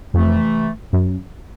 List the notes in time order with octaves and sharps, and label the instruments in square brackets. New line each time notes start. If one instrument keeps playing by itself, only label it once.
[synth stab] F2 [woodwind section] C3 E3 A3
[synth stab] F#2